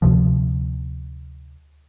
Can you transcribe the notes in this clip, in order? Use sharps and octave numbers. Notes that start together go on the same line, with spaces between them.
D2 C3 F3